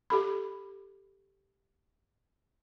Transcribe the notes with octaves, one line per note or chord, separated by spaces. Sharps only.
G4 A4 B5